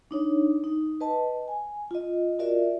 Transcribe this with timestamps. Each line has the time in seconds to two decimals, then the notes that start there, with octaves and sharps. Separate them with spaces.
0.11 D4 D#4 C#5
0.64 D#4
1.01 B4 D#5 A5
1.48 G#5
1.91 F4 D#5
2.39 F4 F#4 A#4 D5 E5